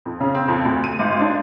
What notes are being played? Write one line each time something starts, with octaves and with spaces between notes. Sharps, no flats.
F2
C#3
C4
F2
D2
D#7
G#1
D4